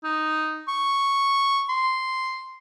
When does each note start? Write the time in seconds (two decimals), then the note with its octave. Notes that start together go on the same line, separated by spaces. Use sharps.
0.04 D#4
0.68 C#6
1.69 C6